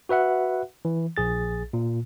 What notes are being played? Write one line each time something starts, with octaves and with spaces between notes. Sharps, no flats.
F#4 B4 E5 F#5
E3
A#1 G#4 A6
A#2